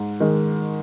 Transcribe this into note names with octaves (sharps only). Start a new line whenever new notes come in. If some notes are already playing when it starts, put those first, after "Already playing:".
Already playing: G#2
D#3 G#3